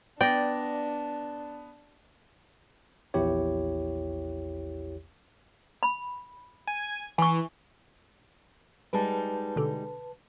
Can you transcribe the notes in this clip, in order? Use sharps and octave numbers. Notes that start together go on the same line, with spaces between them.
B3 D4 D5 G5 A#6
A#1 E2 E4 G4 C#5
B5
G#5
E3 G#5 C#6
G3 G#3 D#4 B4 A5
B2 D3